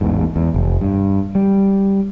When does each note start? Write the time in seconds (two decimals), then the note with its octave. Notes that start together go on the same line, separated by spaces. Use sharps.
0.01 A1 E2 G#2
0.36 E2
0.54 F1
0.81 G2
1.35 G3